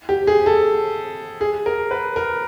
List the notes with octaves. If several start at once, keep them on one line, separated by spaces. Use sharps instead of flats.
G4
G#4
A4
G#4
A#4
B4
A#4